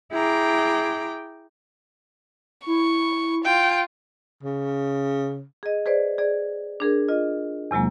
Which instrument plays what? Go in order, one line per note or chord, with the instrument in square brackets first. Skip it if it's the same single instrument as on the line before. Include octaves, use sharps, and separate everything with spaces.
[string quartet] E4 G#4 G5 A#5 D6
[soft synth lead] E4 [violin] C#6
[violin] F4 [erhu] G5
[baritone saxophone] C#3
[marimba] G#4 D#5
G#4 B4 C5 D5
G#4 D5
D4 G#4 A#4
F4 D#5
E2 C3 F#3 G#3 A#3